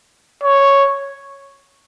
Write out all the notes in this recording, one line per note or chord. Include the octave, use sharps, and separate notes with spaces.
C#5